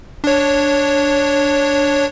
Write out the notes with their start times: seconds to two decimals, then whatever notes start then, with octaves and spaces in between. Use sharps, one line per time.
0.24 D4 C#5